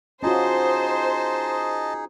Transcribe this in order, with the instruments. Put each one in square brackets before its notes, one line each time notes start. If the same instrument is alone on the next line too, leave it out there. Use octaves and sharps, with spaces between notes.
[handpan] C#4 F4 F#4 [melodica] D#4 G#4 [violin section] C5 [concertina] D#5 A5